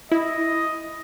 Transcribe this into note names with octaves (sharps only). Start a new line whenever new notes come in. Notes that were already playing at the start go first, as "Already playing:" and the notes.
E4 D#5